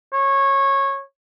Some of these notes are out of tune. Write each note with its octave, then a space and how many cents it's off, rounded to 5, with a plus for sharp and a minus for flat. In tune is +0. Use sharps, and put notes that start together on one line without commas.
C#5 -20